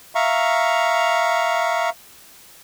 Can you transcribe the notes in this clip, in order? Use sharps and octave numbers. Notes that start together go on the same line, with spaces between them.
E5 F5 A#5 C#6